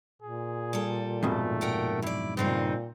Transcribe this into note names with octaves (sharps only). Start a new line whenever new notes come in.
A#2 G#4
G3 A4
F2 G#2 B2 A3
A#4 F#5 G5
F#2 E4 D5
G2 A#2 C#3 C4 D#4